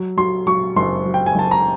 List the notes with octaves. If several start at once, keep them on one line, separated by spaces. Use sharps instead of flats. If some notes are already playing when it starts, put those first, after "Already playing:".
Already playing: F#3
F#3 C6
F#3 C#6
F#1 C6
F#3
G5
G#5
F#1 A5
A#5